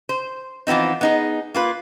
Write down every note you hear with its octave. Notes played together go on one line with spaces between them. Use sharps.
C5
E3 F3 B3 C4 D#4
B3 D#4 G#4
A#3 F4 B4